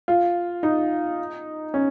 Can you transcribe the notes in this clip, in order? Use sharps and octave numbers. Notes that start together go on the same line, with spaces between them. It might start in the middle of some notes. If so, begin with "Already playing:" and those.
F4
D#4
C#4